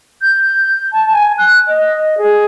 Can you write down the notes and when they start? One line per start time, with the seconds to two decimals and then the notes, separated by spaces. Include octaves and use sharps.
0.22 G6
0.93 A5
1.13 G#5
1.38 F#6
1.68 D#5
2.18 G#4